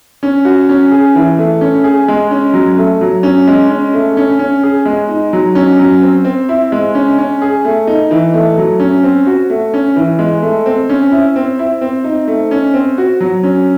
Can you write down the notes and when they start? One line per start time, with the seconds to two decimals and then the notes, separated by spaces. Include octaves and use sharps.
0.23 C#4
0.45 F#4
0.69 C#4
0.91 G#4
1.15 E3
1.38 A3
1.61 C#4
1.84 G#4
2.08 G#3
2.31 C#4
2.54 F#3
2.77 A3
3.01 F#3
3.23 C#4
3.48 G#3
3.70 C#4
3.94 A3
4.17 C#4
4.39 C#4
4.63 G#4
4.85 G#3
5.09 D#4
5.33 F#3
5.55 C#4
5.79 F#3
6.02 C4
6.25 C4
6.49 E4
6.72 G#3
6.95 C#4
7.18 C#4
7.42 G#4
7.65 A3
7.87 D#4
8.11 E3
8.34 A3
8.58 F#3
8.80 C#4
9.03 C4
9.26 F#4
9.50 A3
9.74 C#4
9.96 E3
10.19 G#3
10.42 A3
10.66 C4
10.89 C#4
11.11 E4
11.36 C4
11.59 E4
11.81 C4
12.04 D#4
12.28 A3
12.51 C#4
12.74 C4
12.98 F#4
13.20 F#3
13.43 C#4